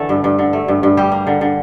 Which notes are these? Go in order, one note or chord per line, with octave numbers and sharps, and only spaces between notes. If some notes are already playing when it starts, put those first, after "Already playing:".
Already playing: D3 E3 A3 A4
G2
G2
D3
A3
G2
G2
G3 G4
A#3
D3
D3